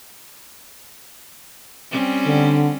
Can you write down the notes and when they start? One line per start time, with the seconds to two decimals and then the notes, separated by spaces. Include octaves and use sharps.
1.91 G3 C4 C#4
2.26 D3